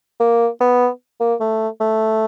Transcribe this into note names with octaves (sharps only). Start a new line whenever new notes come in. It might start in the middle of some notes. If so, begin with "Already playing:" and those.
A#3
B3
A#3
A3
A3